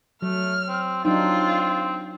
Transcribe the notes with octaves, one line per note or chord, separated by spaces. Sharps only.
F#3 A3 F6
C4
F#3 C4 D4 D#4 F4